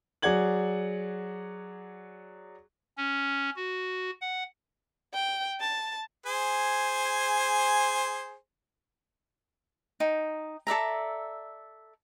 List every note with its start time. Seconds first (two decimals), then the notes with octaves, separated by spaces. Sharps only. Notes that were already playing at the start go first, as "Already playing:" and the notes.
0.22 F#3 G#4 D5 F#5 G#6 F#7
2.98 C#4
3.55 F#4
4.21 F#5
5.14 G5
5.60 A5
6.26 G#4 C5 G#5
10.00 D#4 G5
10.67 A4 D5 E5 A#5